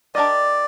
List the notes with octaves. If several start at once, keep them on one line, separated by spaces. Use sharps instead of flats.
D4 G4 A#4 D5 D#5